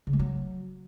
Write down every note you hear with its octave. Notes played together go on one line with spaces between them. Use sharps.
C#3
G#3
F#3